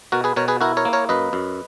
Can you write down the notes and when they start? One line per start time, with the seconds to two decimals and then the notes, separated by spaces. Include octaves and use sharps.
0.12 B2 F#4 A#4
0.24 G#4 B4
0.36 B2 A#4 C#5
0.48 G#4 B4
0.61 E4 F#4 A#4
0.77 A#4 C#5
0.85 A#3
0.93 A#4 C#5
1.09 F#2 B4 D#5
1.33 F#2